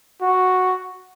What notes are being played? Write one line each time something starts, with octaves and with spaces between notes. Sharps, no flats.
F#4